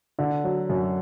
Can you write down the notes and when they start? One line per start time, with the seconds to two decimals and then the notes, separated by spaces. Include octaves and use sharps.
0.19 D3
0.44 F#3
0.69 F#2